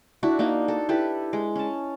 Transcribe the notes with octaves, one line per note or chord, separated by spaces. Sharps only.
D4 E4 F#4
A#3 D4 D#4
A4
E4 G4 A4 B4
G#3
C#4 A5